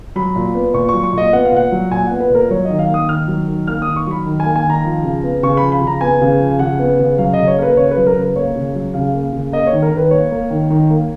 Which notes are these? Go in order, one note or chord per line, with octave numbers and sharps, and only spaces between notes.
F#3 B5
A#2
B3
A#2 C#6
F#3 C#6
C#6
A#2 D#5
B3 F#5
F5
A#2 F#5
F#3
A#2 G#5
B3 F#5
B4
A#2 A#4
F#3 C#5
D#3 D#5
F5
A#3
D#6
D#3 F6
F#3
D#3
A#3 F6
D#3 D#6
C#6
F#3 B5
D#3
G#5
A#3
G#5
D#3
A#5
F3
C#3
B3
C#3 C#6
B5
F3
B5
C#3
A#5
B3 G#5
C#3
F3
C#3 F#5
B3
C#3
F#3 F5
C#3 D#5
C#5
A#3 A#4 B4
C#3 C#5
B4
F#3
A#4
C#3 B4
A#3 C#5
C#3
F#3
C#3 F5
A#3
C#3
A#3 D#5
C#5
D#3
A#4
D#3
B4
A#3 C#5
A#3
D#3
D#3
A#3